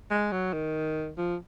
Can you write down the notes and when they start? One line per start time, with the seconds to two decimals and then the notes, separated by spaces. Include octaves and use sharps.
0.10 G#3
0.32 F#3
0.53 D#3
1.18 F3